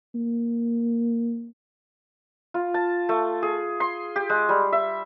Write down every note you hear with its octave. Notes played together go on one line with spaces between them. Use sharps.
A#3
F4
A5
A3
G#4
C6
G4
G#3
G3
E5